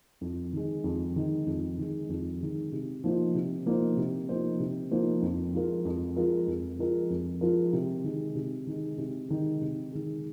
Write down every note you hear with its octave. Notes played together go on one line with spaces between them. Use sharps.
F2
D#3 G#3
F2
D#3 G#3
F2
D#3 G#3
F2
D#3 G#3
C3
F3 A#3 D#4 C5
C3
F3 A#3 D#4 C5
C3
F3 A#3 D#4 C5
C3
F3 A#3 D#4 C5
F2
F3 G#3 F4 A#4
F2
F3 G#3 F4 A#4
F2
F3 G#3 F4 A#4
F2
F3 G#3 F4 A#4
C3
D#3 G#3
C3
D#3 G#3
C3
D#3 G#3
C3
D#3 G#3